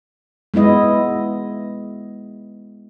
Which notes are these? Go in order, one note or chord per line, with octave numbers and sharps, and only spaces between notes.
G#3 B3 E4 D#5